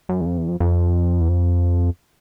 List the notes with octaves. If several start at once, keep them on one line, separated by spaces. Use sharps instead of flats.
F#2
E2
F2
E2
F2
F2
E2
F2